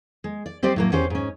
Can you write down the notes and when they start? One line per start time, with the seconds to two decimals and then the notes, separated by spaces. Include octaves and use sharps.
0.24 G#3
0.46 D5
0.63 G3 C4 G4 C5 D5 D#5
0.76 A2 F#3 A#3
0.92 E2 C#4 G4 C5
1.10 G#2 C#4